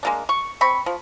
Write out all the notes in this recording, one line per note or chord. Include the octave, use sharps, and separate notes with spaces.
G#3 A#3 D4
C#6
C4 B5 C#6
F3